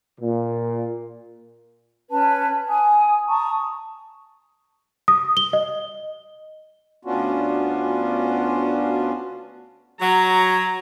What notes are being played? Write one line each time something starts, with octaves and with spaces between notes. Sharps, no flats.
A#2
C#4 B4 A5
G#5 D#6
A5 A#5 C#6 D#6
D#6
G7
D#5
D2 B3 C#4 D4 F4 F#4
F#3 A#5